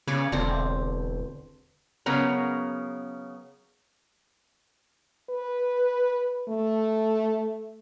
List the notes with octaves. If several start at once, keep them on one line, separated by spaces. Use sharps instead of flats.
C#3 B4 C#5 D5
E1 D3 C4
C#3 F#3 B3 C#4 A#4
B4
A3